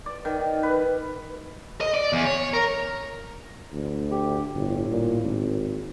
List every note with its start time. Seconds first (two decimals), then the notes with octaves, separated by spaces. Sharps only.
0.06 D5
0.25 D#3
0.63 B4
1.81 D#5
1.94 D5
2.13 E2
2.26 C#5
2.53 A#4
3.73 D2
4.11 G4
4.54 G1 A2
4.91 A#2
5.21 G#1